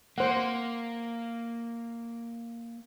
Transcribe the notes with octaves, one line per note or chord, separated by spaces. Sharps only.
A#3 C5 F#5